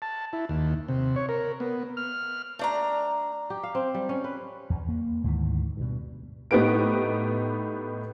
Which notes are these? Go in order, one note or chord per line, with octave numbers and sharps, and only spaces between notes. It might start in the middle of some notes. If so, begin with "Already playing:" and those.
A5
E4
D#2
C3
C#5
A#4
B3
F6
A3 D4 A#5
G4
F5
C4
G3
C#4
B4
E2
A#3
D2 G#2 D#3 E3
G2 B2
A2 B3 D#4 G4 B4 D7